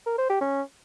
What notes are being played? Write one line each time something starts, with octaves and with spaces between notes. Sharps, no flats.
A#4
C5
G4
C#4